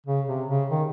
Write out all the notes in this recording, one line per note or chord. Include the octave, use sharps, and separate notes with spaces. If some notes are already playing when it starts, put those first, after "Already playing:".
C#3
C3
C#3
D#3